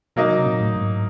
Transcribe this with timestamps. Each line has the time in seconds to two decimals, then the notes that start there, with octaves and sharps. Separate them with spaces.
0.16 B2 F#3 A#3 D#4
0.31 C3
0.46 A#2
0.60 A2
0.76 G#2